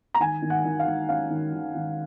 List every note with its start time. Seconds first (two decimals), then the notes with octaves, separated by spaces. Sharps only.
0.15 A#5
0.20 D#3 G#5
0.42 D#3
0.50 F#5
0.65 D#3
0.80 F5
0.86 D#3
1.09 C#4 F5
1.30 D#3
1.53 D#3
1.75 D#3